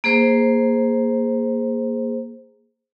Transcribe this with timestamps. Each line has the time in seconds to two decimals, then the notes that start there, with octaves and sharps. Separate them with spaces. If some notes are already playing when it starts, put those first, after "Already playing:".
0.04 A#3 G#4 C5